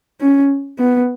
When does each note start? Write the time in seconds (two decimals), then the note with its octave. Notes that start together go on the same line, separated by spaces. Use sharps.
0.21 C#4
0.79 B3